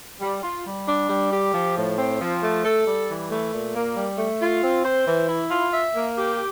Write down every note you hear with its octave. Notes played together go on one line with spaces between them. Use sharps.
G3
F4
G3
D4
G3
G4
F3
A2
C4
F3
A3
A4
G3
E3
A3
A#2
A#3
G3
A3
F4
C4
C5
E3
E4
F4
E5
A#3
G4